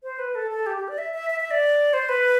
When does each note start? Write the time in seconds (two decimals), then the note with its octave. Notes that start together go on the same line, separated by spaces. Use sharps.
0.03 C5
0.19 B4
0.35 A4
0.51 A4
0.66 G4
0.77 G4
0.88 D5
0.98 E5
1.14 E5
1.30 E5
1.40 E5
1.51 D5
1.93 C5
2.09 B4